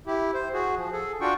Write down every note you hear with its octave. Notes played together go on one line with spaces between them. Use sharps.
E4 G4
C5
F#4 G#4
F3
G#4 A4
D4 F4 F#4 G5 C#6